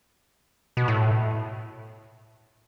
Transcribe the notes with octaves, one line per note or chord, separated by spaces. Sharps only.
B2
A2